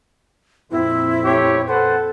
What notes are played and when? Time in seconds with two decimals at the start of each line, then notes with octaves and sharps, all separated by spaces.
0.71 F2 A#2 C4 E4
1.24 A3 G4 C#5
1.67 A4 B4 C5 F#5